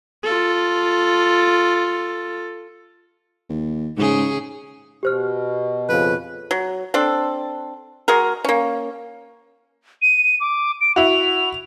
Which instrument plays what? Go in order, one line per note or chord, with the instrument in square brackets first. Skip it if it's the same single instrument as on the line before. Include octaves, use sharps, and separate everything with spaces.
[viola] F4 A4
[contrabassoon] D#2
[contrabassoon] G#2 [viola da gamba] C#3 G#4
[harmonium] B2 [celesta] G4 C5 F6
[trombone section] F2 C#3 [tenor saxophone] B4
[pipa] F#3
C4 D4 A4
G#3 F#4 G#4 A#4
A#3 C#4
[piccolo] D#7
D6
D7
[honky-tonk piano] E4 F#4 [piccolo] F7